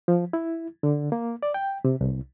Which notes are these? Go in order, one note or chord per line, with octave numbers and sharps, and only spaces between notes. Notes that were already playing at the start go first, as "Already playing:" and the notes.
F3
E4
D3
A#3
D5
G5
C3
C2